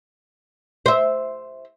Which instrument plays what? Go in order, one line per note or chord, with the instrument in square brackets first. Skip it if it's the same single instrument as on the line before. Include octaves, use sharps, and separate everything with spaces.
[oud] C5 E5